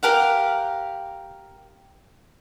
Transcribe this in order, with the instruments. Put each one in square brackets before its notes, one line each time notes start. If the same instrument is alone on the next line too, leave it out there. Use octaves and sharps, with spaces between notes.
[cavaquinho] G4 A#4 F5 F#5